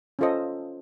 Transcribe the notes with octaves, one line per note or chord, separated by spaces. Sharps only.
C#4 F4 A4 C5 D#5